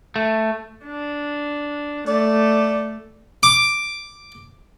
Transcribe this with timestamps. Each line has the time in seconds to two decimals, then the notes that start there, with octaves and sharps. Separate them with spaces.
0.16 A3
0.86 D4
2.08 A3 D5
3.43 D6